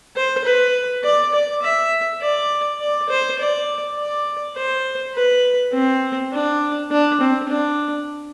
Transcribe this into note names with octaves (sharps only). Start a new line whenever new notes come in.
C5
B4
D5
D5
E5
D5
D5
C5
D5
D5
C5
B4
C4
D4
D4
C4
D4